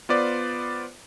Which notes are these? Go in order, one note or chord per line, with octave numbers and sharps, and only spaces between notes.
B3 F4 B4 C5 D5